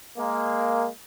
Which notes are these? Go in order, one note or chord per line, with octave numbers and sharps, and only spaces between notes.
G#3 A#3